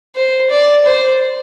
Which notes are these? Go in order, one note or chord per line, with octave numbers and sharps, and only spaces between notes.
C5
D5
C5